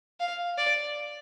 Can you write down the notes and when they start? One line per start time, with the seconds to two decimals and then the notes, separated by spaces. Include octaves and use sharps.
0.20 F5
0.58 D5